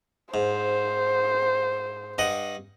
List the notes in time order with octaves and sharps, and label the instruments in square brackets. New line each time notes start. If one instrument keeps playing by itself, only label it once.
[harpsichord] G#2 [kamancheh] C5
[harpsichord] G2 D#5 F#5